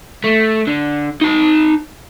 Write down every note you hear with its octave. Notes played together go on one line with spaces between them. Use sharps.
A3
D3
D#4 A5